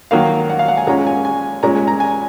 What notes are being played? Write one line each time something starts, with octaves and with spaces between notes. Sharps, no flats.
D#3 F#3 A#3 F5
F#5
F5
F#5
G#5
A#2 G#3 C#4 A#5
G#5
G#5
A#2 G#3 C#4 A#5
G#5
A#5
G#5